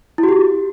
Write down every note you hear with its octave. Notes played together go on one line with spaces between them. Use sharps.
E4
F#4
G4